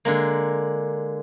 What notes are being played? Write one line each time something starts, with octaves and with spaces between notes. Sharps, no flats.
D3 G#3 A#3